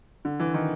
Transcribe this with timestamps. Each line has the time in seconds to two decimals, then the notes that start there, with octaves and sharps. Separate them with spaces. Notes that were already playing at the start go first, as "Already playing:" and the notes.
0.25 D3
0.40 E3
0.54 D#3